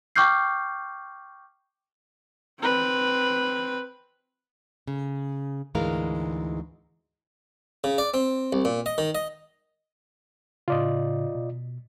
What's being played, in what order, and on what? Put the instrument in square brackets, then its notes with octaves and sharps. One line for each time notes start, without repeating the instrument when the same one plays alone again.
[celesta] G5 C#6 D6 F6 G6 C7
[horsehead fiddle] C4 B4
[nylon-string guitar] C#3
D2 G#2 E3 G#3 A#4 F5
[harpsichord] C#3
D5
C4
C2
A#2
D#5
D#3
D#5
[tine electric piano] A2 C#3 [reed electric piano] F4 D5 D#5
[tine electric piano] B2